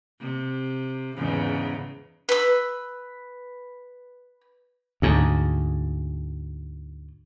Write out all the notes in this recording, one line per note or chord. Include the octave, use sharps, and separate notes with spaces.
C3
E2 G#2 C#3
B4 E6
D2 G#2